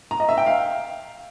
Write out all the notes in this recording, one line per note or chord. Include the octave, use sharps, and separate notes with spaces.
A#5
D#5
E5
G5
F5